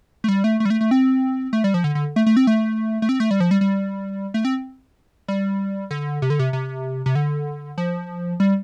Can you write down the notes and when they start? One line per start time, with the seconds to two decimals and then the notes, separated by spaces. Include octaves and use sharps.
0.24 A3
0.28 G3
0.44 A3
0.60 A3
0.65 G3
0.70 A3
0.81 A3
0.91 C4
1.53 A3
1.64 G3
1.74 F3
1.84 D3
1.95 D3
2.16 A3
2.26 A3
2.37 C4
2.47 A3
3.02 A3
3.09 C4
3.20 A3
3.31 G3
3.40 F3
3.51 G3
3.61 G3
4.34 A3
4.45 C4
5.28 G3
5.91 D3
6.22 C3
6.30 D3
6.39 C3
6.53 C3
7.06 C3
7.15 D3
7.78 F3
8.40 G3